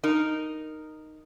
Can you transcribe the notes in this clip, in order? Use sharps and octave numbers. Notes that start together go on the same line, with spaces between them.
D#4 A#4